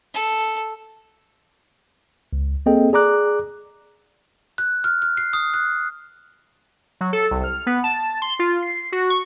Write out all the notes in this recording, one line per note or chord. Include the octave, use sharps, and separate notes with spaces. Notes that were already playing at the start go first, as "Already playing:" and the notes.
A4
C#2
A#3 C4 G#4 A4 D#5 G5
G#4 D5 A#5 D6 F#6
F#6
F6
F6
C7
D#6
F#6
F#3
A4
C2
F6
B3
A5
C6
F4
C7
F#4
C#6